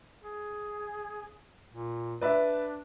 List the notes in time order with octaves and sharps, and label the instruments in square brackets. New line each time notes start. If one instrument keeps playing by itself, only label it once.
[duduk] G#4
A#2
[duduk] D4 [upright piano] B4 D5 E5